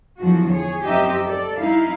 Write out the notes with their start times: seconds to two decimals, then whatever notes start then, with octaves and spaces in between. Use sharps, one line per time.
0.18 E2 D3 F3 F#3 F#4
0.51 G#4 C#5
0.85 F#2 C4 D#4 G4 D#5 E5
1.26 A4 D5
1.58 G3 D#4 E4 F5